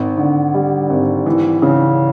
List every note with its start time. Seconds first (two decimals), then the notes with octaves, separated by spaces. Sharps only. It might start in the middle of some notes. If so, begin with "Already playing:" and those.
Already playing: G#1
0.18 D3
0.54 G3
0.90 G#1
1.26 E3
1.62 C#3